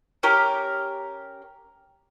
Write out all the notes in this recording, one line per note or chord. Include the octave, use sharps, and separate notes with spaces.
C#4 G4 A#4